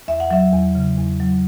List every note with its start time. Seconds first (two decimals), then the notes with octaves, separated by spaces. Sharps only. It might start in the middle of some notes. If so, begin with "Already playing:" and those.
0.08 E2 E5
0.20 F#5
0.31 F#3 E5
0.53 E2
0.75 C#3
0.97 E2
1.20 F#3